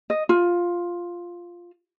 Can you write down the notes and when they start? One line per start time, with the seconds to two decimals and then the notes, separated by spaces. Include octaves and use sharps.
0.10 D#5
0.29 F4